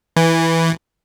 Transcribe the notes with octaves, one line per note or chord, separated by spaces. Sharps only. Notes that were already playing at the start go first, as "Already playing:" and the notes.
E3